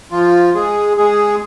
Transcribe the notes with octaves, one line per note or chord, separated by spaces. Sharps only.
F3 F4
G#3 G#4
G#3 G#4